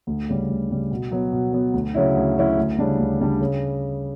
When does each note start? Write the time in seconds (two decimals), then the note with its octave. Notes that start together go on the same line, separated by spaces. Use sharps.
0.07 D2
0.29 C#3 G3
0.49 D2
0.70 C#3 G3
0.91 B2
1.12 F#3 B3
1.33 B2
1.53 F#3 B3
1.74 D2
1.94 C#3 F#3 C#4 E4
2.16 D2
2.36 C#3 F#3 C#4 E4
2.57 D2
2.78 C#3 G3 D4
2.99 D2
3.20 C#3 G3 D4
3.41 C#3